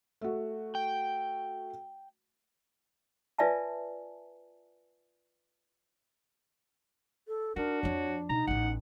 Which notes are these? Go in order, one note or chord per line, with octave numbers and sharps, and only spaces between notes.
A3 F#4
G5
F4 B4 D5 E5 G#5 A5
A4
D4 D#4 F#4 A#4
F2 F3 C#5
B2 D#4 A#5
A1 A2 F#5